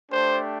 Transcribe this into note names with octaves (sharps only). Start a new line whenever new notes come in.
A3 D4 G4 C5